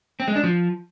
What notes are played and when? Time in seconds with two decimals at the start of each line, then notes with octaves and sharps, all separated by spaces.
0.20 C4
0.28 G#3
0.36 D4
0.44 F3